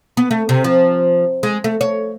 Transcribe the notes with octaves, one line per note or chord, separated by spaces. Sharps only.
B3
A3
C3
F3
G#3
A3
C#5